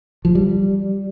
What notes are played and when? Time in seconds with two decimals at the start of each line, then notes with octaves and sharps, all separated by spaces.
0.25 F3
0.35 G3